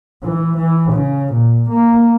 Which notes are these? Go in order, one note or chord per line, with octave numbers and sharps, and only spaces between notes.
E3
E3
C#3
A#2
A#3